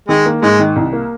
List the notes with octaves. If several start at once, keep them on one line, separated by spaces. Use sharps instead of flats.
D#3 G#3
A#3
G#2 G#3
D#3
C2
A#3